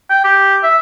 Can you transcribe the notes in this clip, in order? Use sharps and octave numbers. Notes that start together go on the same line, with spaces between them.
G5
G4
E5